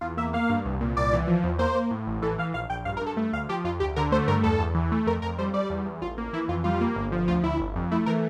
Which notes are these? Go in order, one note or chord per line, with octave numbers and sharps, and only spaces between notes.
E2 F4
A#3 E5
A#3 F5
G2
C2
A#2
C2 D5
E3
F3
E2
A#3 C5
A#3
A2
A1
E3 A4
E3 F5
A#1 F5
A#1 G5
G2 F5
A#4
G2
A4
A3
D2 F5
F3 G4
F2 F4
D2 G4
D3 A#4
A3 C5
G2 A#4
E2 A4
E2
E3
A3
F2 A#4
F2 A#4
G3 C5
G3 D5
E2
E2
A1 F4
A#3
E3 E4
F2 F4
G3 F4
A#3
G1
F3
D2 F4
D2 E4
G1
F2
A3 E4
E3 A#4